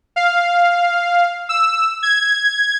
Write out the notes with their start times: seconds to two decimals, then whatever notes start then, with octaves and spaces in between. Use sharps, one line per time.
0.16 F5
1.49 E6
2.03 G#6